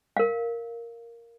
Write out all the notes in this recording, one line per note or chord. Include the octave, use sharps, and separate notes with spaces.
A#4 F5